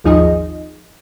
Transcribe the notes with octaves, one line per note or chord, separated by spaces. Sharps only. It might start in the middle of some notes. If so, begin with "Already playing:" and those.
G#1 D#2 F3 D#4 G#4 D#5